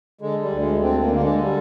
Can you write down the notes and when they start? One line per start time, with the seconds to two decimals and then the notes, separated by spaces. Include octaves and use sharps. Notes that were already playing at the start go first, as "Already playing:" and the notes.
0.21 D3 G#3
0.42 G3
0.51 D2
0.62 G#3
0.81 D3 C4
1.01 A#3
1.12 D3 A#3
1.22 G#3
1.41 G3